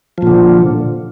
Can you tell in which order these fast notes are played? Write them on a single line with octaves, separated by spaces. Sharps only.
F3 A#2 D3